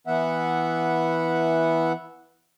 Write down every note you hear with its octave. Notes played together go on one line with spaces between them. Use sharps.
E3 B3 E5 F#5